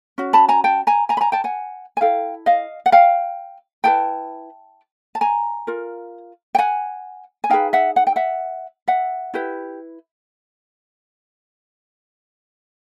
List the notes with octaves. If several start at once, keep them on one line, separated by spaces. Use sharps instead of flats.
C#4 F#4
A5 B5
G#5 A#5
G5 A5
G#5 A#5
G#5 A#5
B5
G#5 A#5
G5 A5
F#5 G#5
G#5
E4 A4 F5 G5
D#5 F5
F#5
F5 G5
E4 G#4 B4 G5 A5
A5
G#5 A#5
F4 A#4
G5
F#5 G#5
G#5
D#4 G#4 B4 F5 G5
E5 F#5
F#5
G5
E5 F#5
E5 F#5
E4 G4 B4